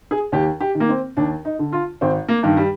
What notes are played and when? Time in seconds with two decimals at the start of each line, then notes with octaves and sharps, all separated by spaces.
0.11 G#4
0.32 D#2 G4
0.60 G4
0.75 D#3
0.80 A#3
0.89 C4
1.17 D#2 D4
1.45 D#4
1.59 D3
1.73 F4
2.01 G#1 C4
2.28 A#3
2.43 G2 D#3
2.57 G3